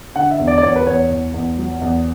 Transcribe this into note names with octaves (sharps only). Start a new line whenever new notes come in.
D3 F#5
E5
E2
D5
D5
E2 C#5
B4
E2 C#5
E2
E2
F#3
E2